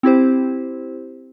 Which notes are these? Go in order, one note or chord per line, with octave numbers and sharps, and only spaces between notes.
C4 E4 G4 C5